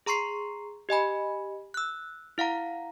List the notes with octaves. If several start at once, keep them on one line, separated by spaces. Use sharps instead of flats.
G#4 A#5 C6 C#6 C7
G4 D#5 G#5 B5
E6 F#6
E4 F5 F#5 A#5